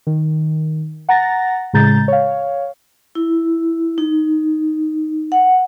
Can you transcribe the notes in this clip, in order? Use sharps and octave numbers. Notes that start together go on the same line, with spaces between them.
D#3
F#5 A#5 A6 A#6
A2 C#3 G#3 A#5 G6 A6
C#5 F5
E4
D#4
F#5